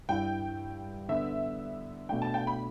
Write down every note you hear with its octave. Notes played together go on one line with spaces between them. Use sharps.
G2 G3 E4 G5
D3 B3 D4 E5
B2 A3 D4 G5
A5
G5
B5